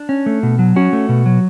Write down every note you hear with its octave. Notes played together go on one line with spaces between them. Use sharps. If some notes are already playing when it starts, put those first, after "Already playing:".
Already playing: D4
C#4
A3
B2
F#3
C#4 F#4
A3
B2
F#3